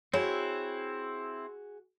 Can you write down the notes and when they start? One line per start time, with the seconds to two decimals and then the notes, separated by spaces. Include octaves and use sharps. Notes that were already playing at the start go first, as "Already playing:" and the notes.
0.13 C4 E4 F#4 G#4 C#5